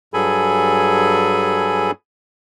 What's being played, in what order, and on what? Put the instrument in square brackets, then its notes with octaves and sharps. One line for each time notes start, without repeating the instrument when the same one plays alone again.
[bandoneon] G2 F#3 G#4 A4 G#5 B5